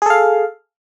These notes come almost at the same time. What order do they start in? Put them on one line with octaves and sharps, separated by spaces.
G#4 A4 F5